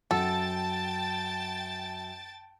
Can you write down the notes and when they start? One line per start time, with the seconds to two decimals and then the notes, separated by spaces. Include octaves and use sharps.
0.11 F#2 A4 F#5 G5 A5 A6